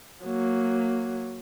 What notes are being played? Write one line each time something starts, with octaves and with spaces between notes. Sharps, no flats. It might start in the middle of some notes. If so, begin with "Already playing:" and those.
F#3 A#3